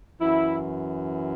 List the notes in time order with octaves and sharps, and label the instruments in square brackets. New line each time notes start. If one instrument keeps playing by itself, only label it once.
[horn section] F#2 E3 E4